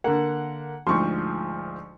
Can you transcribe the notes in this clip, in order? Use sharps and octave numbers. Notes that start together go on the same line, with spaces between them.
D3 A#3 F#5
D2 G#2 F3 C6 C#6